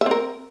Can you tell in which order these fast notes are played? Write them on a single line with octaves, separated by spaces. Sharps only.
E5 C4 A#4